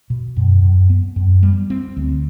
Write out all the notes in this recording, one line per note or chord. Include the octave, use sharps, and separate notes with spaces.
B2
F#2
F#2
B3
F#2
G3
C4
D2